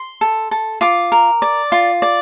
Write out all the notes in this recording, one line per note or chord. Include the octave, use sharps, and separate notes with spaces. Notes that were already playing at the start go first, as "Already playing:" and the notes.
Already playing: C6
A4
A4
F4 D6
A#4
D5
F4
D5